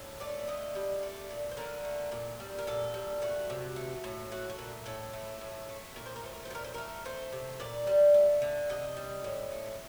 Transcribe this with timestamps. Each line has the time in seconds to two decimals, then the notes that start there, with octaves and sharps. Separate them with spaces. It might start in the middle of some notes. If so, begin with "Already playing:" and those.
Already playing: A2
0.20 A3 D5
0.47 D3 D#5
0.75 G3
1.03 A3 D5
1.30 A#2
1.51 C5
1.57 D3 A#4
1.85 A3
2.12 A#2
2.40 G3
2.59 A#4
2.67 A#2 A4
2.94 G3
3.22 A3 F#4
3.50 C3
3.76 A3
4.04 A2
4.32 A3 F#4
4.50 F#4
4.59 A#2
4.86 A2 A4
5.13 A3
5.41 A2
5.69 A3
5.96 A#2 A#4
6.06 C5
6.16 A#4
6.23 A3 C5
6.34 A#4
6.45 C5
6.51 A#2 A#4
6.64 C5
6.74 A3 A#4
7.05 A3 C5
7.33 C3
7.60 A#2 D5
7.87 G3
8.14 A3
8.42 D3
8.69 C3 D#5
8.97 G3
9.24 A2
9.52 A3